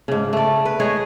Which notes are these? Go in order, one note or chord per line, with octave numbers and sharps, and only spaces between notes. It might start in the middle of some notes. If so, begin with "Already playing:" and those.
G#2 C#3
A3 D5
B4
G#3 G#4 C#5 D#5